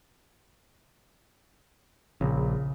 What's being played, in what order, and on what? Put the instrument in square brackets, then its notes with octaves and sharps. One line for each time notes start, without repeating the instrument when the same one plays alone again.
[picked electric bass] A#1 [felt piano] C#3